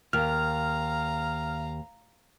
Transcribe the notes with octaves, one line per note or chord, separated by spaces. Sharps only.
D#2 F5 A#5 F6